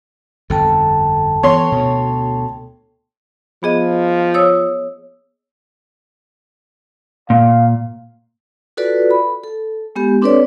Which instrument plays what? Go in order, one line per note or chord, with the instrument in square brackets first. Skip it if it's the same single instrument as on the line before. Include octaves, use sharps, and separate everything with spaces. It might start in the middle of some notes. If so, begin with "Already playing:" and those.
[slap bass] G1 F2 [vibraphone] A4 G5 A5
[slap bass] E3 B3 [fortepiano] C#5 C6
[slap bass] D2 B2
[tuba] F3 [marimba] B3 G#4 D#5
[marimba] C#5 D#6 E6
[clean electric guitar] A#2 [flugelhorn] F5
[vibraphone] F4 F#4 A4 B4 D5
B5
A4
G#3 B3 G4
C4 D4 A4 B4 C#5 D5